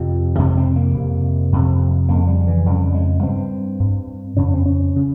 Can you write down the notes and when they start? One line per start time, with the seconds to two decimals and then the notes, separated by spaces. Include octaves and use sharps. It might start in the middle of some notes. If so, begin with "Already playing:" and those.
Already playing: F2 C3 F3
0.38 F2 C3 G#3
0.57 C4
0.76 A#3
0.94 F2 C3
1.53 F2 C3
2.09 F2 C#3 A#3
2.27 G3
2.47 E3
2.66 F2 C#3 G3
2.94 G#3
3.23 G2 C4
3.80 G2
4.37 F2 C#3 C#4
4.54 C4
4.66 C#4
4.96 C#3